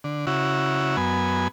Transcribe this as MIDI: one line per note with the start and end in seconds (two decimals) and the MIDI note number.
0.04 0.26 50
0.27 0.96 49
0.27 0.96 64
0.27 0.96 66
0.97 1.48 42
0.97 1.48 59
0.97 1.48 80